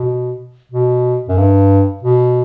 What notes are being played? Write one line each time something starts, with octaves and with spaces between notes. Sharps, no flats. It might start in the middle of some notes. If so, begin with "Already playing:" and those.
Already playing: B2
B2
F#2
G2
B2